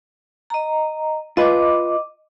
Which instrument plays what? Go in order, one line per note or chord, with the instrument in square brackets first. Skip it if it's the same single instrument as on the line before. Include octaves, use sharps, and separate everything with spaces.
[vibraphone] D#5 A#5
[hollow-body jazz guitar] F4 B4 [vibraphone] D#5 D6